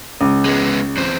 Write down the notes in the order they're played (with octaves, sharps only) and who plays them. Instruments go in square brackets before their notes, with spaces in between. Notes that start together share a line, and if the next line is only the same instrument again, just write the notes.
[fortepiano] C#2
[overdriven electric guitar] G#3 B3
E2 C4